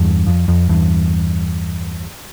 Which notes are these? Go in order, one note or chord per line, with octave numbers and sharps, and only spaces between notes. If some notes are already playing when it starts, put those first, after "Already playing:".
Already playing: E2 G2
F2
F2
E2 G2